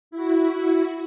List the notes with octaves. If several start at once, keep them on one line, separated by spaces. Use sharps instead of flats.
E4 F#4